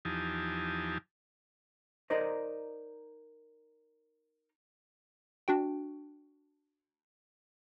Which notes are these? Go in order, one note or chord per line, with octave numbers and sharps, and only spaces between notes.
E2 F3 D#4 G4 G#5 A5
D#4 A#4 C5 D5 D#5
D4 F#4 G5